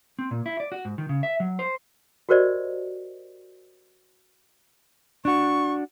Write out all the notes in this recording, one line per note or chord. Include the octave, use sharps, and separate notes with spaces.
C4
A#2
E4
D5
F#4
G#2
D#3
C#3
E5
F#3
C5
F#4 G4 A#4 C5 D5 D#5
D4 F#4 C#6